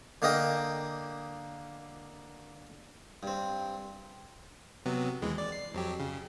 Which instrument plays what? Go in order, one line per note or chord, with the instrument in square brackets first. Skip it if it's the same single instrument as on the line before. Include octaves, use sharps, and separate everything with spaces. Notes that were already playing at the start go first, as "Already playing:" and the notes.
[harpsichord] D3 A#3 A#4 D#5 G5
G2 C4
[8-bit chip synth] C3 F#3 B3
D#2 E3 G#3
D5
C7
F2 F#3 G4
C#3